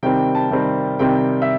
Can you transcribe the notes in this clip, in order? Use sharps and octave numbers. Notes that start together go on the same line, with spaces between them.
C3 D#3 G3 C4 G5
A5
C3 D#3 G3 C4
C3 D#3 G3 C4 G5
E5